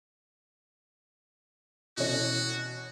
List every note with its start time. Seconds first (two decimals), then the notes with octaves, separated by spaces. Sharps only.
1.97 B2 E3 C#4 F#4